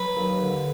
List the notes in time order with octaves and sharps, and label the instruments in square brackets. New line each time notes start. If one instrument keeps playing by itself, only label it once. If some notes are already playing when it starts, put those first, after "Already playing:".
Already playing: [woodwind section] F#3 [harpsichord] B4
[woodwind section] D#2
D3